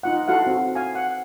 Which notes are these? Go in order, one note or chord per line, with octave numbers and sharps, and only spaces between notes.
D#4 F4 F#5
E4 F#4 A4 F5 F#5
C4 F#4
F5 G#5
F#5